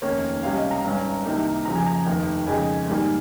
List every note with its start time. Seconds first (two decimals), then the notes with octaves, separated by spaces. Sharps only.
0.02 F1 D#2 D#3 A#3 C#4 C#5
0.43 C#2 C3 G3 C#4 F5
0.56 D#5
0.71 A#5
0.84 G#1 G2 G3 C#4
1.25 C2 C3 D#3 A#3 D#4
1.65 F2 C#3 F3 A#5
1.76 G#5
1.86 A#5
2.06 F1 D#2 D#3
2.47 F2 C#3 G#3 D#4 G#5
2.87 G#2 D#3 G3 A#3